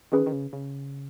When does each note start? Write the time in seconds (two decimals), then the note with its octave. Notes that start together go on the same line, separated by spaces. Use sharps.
0.12 D#3 C#4 G#4 B4
0.26 D#3
0.33 C#3
0.53 C#3